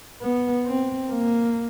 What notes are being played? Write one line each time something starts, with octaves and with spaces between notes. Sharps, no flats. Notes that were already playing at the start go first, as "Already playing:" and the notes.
B3
C4
A#3